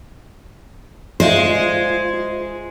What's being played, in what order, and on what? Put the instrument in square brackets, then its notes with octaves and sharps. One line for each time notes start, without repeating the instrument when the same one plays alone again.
[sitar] G#3 [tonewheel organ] F4 [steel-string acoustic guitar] C5 [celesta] D5 E5 F5